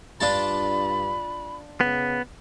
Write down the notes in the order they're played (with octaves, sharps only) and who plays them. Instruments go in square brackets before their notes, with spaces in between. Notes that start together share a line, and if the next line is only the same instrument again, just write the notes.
[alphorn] G2 [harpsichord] D4 F4 A5 [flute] B5
[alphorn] C#3 [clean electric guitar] B3